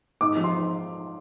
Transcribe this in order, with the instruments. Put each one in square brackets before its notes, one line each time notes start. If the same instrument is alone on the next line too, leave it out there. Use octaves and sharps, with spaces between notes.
[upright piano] G#2 D6
F3
C6